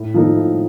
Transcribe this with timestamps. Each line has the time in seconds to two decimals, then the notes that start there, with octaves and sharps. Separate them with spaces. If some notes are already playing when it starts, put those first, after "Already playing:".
Already playing: A2
0.14 F3 A#3 D#4 A4
0.36 A2